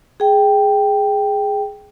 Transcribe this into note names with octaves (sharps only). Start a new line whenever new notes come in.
G#4 G5